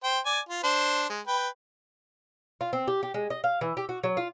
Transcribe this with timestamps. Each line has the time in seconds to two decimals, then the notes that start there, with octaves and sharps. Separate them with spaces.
0.04 C5 G5
0.26 D5 G#5
0.49 F4
0.63 D4 C5
1.09 G#3
1.27 B4 G5
2.61 F4
2.73 C4
2.88 G4
3.03 G4
3.14 G#3
3.30 D#5
3.44 F5
3.61 E3
3.77 G4
3.89 F#4
4.03 F#3
4.17 F4